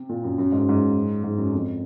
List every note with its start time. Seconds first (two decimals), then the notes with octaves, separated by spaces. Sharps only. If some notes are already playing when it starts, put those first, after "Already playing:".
Already playing: C3
0.09 A#2
0.24 F#2
0.38 F#2
0.52 G#2
0.61 F#2
0.69 G#2
1.24 G#2
1.38 F#2
1.53 F2